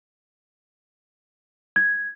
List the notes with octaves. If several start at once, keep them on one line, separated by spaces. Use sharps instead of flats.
G#6